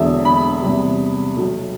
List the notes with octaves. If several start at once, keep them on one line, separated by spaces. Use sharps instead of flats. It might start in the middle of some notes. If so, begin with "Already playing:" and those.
Already playing: E1 E2 D3 F#3 E5
B5
E2 C3 G3
B1 B2 F#3